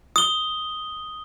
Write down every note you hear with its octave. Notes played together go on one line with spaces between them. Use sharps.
D#6 G7